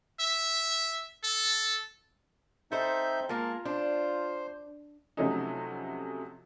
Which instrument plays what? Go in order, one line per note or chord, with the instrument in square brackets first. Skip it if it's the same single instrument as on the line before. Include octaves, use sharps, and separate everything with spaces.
[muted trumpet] E5
A4
[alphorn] C4 [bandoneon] D#4 E5 G6 [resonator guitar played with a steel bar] A4 C5
[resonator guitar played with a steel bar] G#3 A#3 [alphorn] F4 [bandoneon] A#4 A5
[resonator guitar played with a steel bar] D4 [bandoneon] C5
[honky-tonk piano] C3 F3 F#3 A3 C#4 D#4